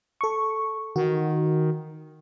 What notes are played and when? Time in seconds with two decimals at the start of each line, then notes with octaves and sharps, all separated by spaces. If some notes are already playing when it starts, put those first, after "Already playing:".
0.21 A4 C#6
0.96 D#3 F#4